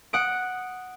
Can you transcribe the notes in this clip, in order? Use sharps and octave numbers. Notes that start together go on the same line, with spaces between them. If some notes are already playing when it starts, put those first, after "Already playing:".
F#5 D#6 D7